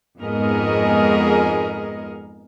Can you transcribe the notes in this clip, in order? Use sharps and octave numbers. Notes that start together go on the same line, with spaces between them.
F2 G#2 B3 G#4 A#4 D#5